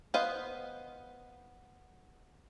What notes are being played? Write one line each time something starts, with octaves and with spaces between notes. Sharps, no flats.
B3 B4 C5 D#5 F5